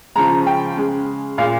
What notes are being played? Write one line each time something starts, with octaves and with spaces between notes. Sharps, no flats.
C#3 F3 G#3 A#5
G5
C#3 G#3
A#2 G#3 F5